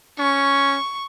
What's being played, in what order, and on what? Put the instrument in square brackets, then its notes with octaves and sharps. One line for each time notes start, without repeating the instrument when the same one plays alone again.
[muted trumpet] C#4 [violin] C#6